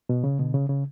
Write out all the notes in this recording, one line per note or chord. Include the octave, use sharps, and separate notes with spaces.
B2
C#3
B2 D3
C#3
C#3